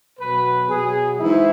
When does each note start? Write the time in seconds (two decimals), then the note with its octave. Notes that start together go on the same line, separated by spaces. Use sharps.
0.19 B2 F#3 B4
0.69 B2 F#3 G#4
1.19 G#2 E3 E4